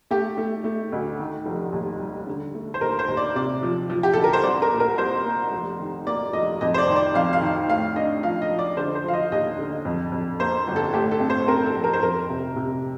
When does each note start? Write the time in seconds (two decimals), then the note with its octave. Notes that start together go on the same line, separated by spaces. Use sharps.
0.11 A3 G4
0.37 A3
0.64 A3
0.92 D2
1.19 D#3
1.46 F1
1.73 D#2
2.00 G3
2.27 D3
2.55 A3
2.74 C5
2.81 D#2 A#4
2.99 C5
3.08 D#2
3.17 D5
3.35 C3 D5
3.63 F3
3.90 F3
4.03 G4
4.14 D2 A4
4.24 A#4
4.33 C5
4.43 C2 D5
4.62 A#4
4.72 A#2
4.80 A#4
4.98 C2 C5
5.25 A#3
5.52 F1
5.79 D#3
6.07 A#3 D5
6.33 F1 D#5
6.61 F2 D#5
6.74 C5
6.78 D5
6.88 D#3
6.96 D5
7.14 F2 F5
7.33 F5
7.41 D#3
7.68 A2 F5
7.96 D4 D#5
8.23 F3 F5
8.42 D#5
8.50 F3
8.59 D5
8.77 D3 C5
8.95 C5
9.04 F3 F5
9.13 D#5
9.32 D#2 D#5
9.59 D3
9.85 F2
10.12 F2
10.39 A#3 C5
10.67 G1
10.76 A4
10.93 A2 G4
11.11 A4
11.20 C4
11.30 C5
11.48 C4 A#4
11.66 A4
11.75 A#1
11.84 A#4
11.93 C5
12.02 F2 A#4
12.29 C3
12.56 C3